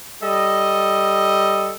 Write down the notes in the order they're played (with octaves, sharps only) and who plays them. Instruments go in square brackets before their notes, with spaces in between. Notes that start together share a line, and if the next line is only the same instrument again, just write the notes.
[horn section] G3 A4 D#5